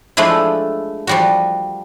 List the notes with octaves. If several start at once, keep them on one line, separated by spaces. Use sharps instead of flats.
F3 G#3 A3 D4 E4
F3 G3 F#4